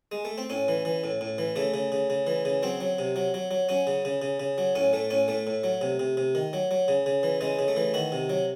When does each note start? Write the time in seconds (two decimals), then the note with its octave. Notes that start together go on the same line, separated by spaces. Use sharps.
0.12 G#3
0.25 A3
0.38 C4
0.50 A2 C#4
0.68 E3
0.85 E3
1.04 A2
1.21 A2
1.38 E3
1.56 C#3 A3
1.74 C#3
1.92 C#3
2.10 C#3
2.27 E3
2.45 C#3
2.63 F#3 C4
2.80 F#3
2.99 C3
3.16 F#3
3.34 F#3
3.51 F#3
3.69 F#3 C#4
3.87 C#3
4.05 C#3
4.22 C#3
4.40 C#3
4.58 F#3
4.75 A2 C#4
4.93 A2 A3
5.10 A2 C#4
5.28 A2 A3
5.47 A2
5.64 F#3
5.81 C3
5.99 C3
6.17 C3
6.35 D#3
6.53 F#3
6.71 F#3
6.88 C#3
7.06 C#3
7.23 E3
7.41 C#3 G#3
7.59 C#3
7.68 A3
7.76 E3
7.94 D#3 F#4
8.12 C3
8.30 F#3